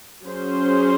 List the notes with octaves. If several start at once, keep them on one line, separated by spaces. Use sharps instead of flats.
F#3 C#4 G#4 C5